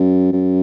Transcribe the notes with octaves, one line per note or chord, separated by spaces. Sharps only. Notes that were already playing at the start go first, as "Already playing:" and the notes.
Already playing: F#2
F#2